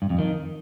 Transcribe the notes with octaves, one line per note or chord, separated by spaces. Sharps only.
G2
F2
D#3